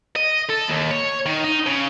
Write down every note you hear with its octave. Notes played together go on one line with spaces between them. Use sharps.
D#5
A4
D#2
C#5
D#3
D#4
C#3